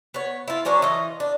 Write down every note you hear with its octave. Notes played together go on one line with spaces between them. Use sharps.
B3 C#5
E4 F4
F#3 C#4 D4 C#5
E3 F4 D#5
D4